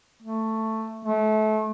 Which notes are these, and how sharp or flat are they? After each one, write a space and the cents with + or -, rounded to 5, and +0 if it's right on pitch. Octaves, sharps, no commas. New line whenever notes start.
A3 +10
A3 -30